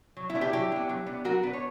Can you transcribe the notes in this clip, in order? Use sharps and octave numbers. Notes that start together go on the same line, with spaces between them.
F#3
E4
B3 D4
E4 G4
F#3 E4 G4
B3 D4
F#3
B3 D4
F#3 F#4 A#4
B3 D4 B4
C#5